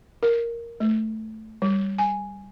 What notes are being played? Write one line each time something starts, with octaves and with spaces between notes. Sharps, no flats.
A#4
A3
G3
G#5